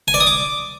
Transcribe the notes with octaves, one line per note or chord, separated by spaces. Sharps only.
G#5
D5
D#6
D6